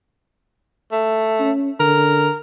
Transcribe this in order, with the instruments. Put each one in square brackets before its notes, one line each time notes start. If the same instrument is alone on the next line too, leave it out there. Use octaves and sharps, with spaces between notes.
[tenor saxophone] A3
[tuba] C#4
[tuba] D3 [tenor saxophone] A#4